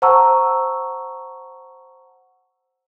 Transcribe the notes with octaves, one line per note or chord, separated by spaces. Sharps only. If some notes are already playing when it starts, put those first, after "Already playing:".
C5 F#5 A5 A#5 C#6 E6